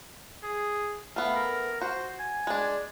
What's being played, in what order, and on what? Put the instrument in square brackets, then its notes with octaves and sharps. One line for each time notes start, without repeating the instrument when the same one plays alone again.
[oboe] G#4
[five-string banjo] A3 B3 [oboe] F5
[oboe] A#4
[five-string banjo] F#4 [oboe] C5
[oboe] G#5
[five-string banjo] G#3 D4